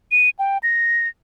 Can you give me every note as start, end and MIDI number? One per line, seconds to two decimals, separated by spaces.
0.12 0.30 99
0.39 0.58 79
0.63 1.08 94